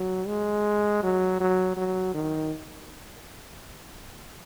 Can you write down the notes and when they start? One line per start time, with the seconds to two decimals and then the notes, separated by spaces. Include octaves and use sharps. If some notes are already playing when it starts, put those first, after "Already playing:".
Already playing: F#3
0.27 G#3
1.03 F#3
1.40 F#3
1.77 F#3
2.14 D#3